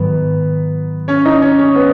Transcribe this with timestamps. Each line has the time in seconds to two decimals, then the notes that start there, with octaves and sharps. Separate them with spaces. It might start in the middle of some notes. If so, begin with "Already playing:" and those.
Already playing: G#2 D#3 F#3 B3 B4
1.08 C#4 C#5
1.25 D#4 D#5
1.42 C#4 C#5
1.59 C#4 C#5
1.75 B3 B4